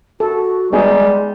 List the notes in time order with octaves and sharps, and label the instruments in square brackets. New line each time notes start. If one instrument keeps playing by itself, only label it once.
[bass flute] F#4 [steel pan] A4
[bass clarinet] G3 [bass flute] G#3 [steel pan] B3 D#4 G#4